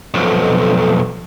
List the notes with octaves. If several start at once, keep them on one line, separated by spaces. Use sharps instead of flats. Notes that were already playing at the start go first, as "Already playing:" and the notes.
B1 F2